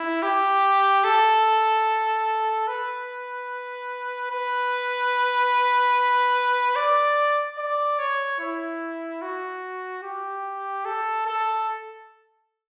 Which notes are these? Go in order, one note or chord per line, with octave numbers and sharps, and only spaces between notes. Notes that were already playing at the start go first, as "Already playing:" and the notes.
Already playing: E4
G4
A4
B4
B4
D5
D5
C#5
E4
F#4
G4
A4
A4